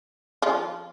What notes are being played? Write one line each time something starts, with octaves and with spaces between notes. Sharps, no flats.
F3 F4